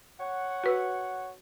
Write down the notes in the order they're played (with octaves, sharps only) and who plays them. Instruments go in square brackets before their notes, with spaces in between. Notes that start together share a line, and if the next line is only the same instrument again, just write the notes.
[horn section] C#5 F#5
[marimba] F#4 B4 E6